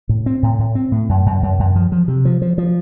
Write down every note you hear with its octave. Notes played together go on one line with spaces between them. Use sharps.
A2
C4
A2
A2
C4
A2
F#2
F#2
F#2
F#2
F3
F3
C3
F3
F3
F3